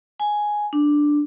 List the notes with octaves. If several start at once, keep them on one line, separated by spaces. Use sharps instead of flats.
G#5
D4